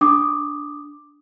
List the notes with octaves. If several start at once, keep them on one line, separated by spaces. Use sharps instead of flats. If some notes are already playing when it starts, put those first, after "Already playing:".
D4 D6 D#6